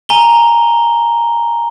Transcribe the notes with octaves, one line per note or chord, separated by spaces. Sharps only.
G#5 A#5 F7 G7